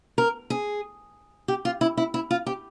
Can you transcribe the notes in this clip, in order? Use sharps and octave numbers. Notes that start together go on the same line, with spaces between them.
A#4
G#4
G4
F4
E4
E4
E4
F4
G4